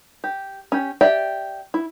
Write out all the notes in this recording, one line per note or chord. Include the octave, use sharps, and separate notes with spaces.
G4
C#4 G4
G4 D5 E5 G5
E4